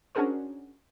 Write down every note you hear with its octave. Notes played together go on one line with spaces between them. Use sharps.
C#4 D4 F#4 G#4 A#4 C5